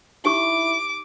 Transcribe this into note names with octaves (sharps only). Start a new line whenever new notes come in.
D#4 E4 G4 C#6 D6